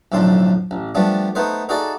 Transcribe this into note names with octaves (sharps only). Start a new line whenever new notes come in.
B1 F2 A2 D3 C6
A1
F3 G3 A3 B3 D4
A3 B3 D#4 B4 C5
D#4 F#4 G#4 A4 D5 E5